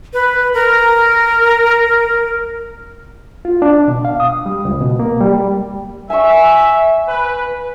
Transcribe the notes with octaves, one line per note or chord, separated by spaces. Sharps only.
B4
A#4
F4
D4
B2
F5
D#6
G3
C#2
B2
A#3
G3
G3
E5 G#5 C#6
B4